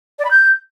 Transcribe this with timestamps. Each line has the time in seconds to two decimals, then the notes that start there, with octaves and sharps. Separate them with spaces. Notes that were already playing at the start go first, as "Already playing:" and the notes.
0.19 D5
0.24 B5
0.30 G6